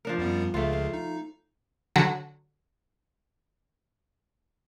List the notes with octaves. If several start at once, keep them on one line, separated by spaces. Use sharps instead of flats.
F3 D4 A#4
F#2 G3 B3
C#2 C#3 A3 F4
F5
D#4
D3 F#3 F#4